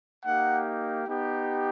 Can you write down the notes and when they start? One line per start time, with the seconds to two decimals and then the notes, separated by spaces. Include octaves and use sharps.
0.25 A#3 D#4 G4 F#5
1.07 B3 D#4 G4